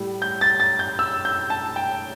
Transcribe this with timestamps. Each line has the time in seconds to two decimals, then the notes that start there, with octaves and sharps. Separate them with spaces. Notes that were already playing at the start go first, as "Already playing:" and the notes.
Already playing: A2 G3
0.22 G6
0.41 A6
0.60 A6
0.79 G6
0.99 E6
1.25 G6
1.50 A5
1.76 G5